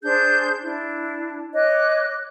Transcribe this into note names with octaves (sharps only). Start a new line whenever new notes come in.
D4 G#4 C5 G6
D4 E4
C#5 D#5 D6 F#6